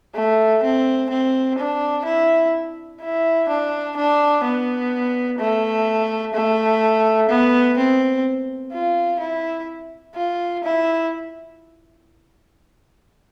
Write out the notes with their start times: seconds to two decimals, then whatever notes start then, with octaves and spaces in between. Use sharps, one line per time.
0.15 A3
0.63 C4
1.10 C4
1.59 D4
2.06 E4
3.02 E4
3.49 D4
3.97 D4
4.45 B3
5.39 A3
6.34 A3
7.29 B3
7.78 C4
8.73 F4
9.20 E4
10.15 F4
10.64 E4